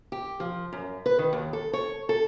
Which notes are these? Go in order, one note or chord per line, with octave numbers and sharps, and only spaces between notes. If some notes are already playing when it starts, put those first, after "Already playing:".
G4
F3
F#2
B4
D#3
D#2
A4
C#5
A4